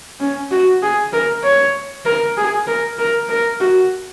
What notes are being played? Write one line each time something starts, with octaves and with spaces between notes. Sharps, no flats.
C#4
F#4
G#4
A#4
C#5
A#4
G#4
A#4
A#4
A#4
F#4